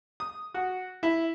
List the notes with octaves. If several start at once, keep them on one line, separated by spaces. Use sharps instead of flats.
D#6
F#4
E4